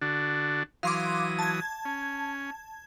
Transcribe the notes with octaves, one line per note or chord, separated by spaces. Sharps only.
D3 D4 F#4
E3 F#3 F5 C6 D6 D#6
A5 G#6
C#4